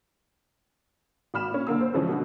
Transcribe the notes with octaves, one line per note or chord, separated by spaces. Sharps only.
G#1 F#4 B5 F6 E7
A#2 C#4
F#1 D3 A#3 E6
C5
G2 C#3 E3 F3 G#3 C#4
B2 D3